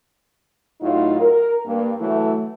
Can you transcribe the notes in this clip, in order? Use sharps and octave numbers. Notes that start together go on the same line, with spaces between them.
A2 F#3 D#4 F4
A#4
G2 A#3
E3 F#3 A3